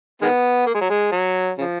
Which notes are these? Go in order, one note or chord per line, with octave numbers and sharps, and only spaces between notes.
D#3 G#3 B3
A#3
G#3
F#3
G#3
F#3
C#3 F3